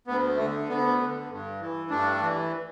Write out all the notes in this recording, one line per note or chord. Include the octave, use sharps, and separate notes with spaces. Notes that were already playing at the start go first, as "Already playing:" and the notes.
D2 B3
D3 A3
D2 B3
D3
G2
E3
G2 A3 D4
E3